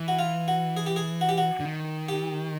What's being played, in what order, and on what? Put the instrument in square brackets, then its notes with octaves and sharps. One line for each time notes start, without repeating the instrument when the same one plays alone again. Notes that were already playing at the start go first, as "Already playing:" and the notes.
Already playing: [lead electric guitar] E3
[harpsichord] F#4
F4
F#4
G#4
G4
G#4
F#4
G4
F#4
[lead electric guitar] D3
D#3
[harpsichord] G4